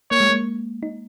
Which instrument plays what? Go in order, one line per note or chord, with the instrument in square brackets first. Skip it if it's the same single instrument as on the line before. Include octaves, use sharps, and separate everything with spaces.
[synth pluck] A#3 [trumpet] C#5
[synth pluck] G#3
A#3
D#4